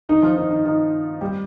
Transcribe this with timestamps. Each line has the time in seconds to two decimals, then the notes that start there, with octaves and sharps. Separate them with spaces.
0.09 D#3 D#4
0.22 F3 F4
0.37 D#3 D#4
0.51 D#3 D#4
0.65 D#3 D#4
1.21 G3 G4